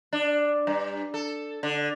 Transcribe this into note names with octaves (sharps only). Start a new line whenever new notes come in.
D4
G2
A4
D3